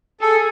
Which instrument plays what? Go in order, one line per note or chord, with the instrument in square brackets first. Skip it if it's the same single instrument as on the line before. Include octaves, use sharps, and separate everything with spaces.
[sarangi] G#4 [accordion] A4